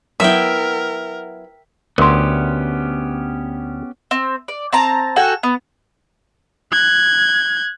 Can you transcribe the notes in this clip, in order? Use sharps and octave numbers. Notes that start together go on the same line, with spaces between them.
F#3 B3 E4 A#4 E5 G5
D2 B3 C#4 G4 A#4 C6
C4
D5
C4 A5 A#5
F#4 A4 G5 G#5
B3
F#6 G#6